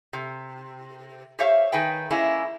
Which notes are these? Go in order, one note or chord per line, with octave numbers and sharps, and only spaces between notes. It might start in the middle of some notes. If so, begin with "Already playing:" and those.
C3
G4 C5 C#5 E5 F5
D#3 G#4 B4 G5
G#3 A#3 C#4 E4